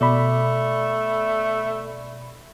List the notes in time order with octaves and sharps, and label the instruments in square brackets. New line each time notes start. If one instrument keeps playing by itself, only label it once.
[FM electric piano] B2 D5 B5 [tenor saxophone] A3